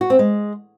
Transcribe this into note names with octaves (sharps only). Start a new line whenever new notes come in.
F#4
C4
G#3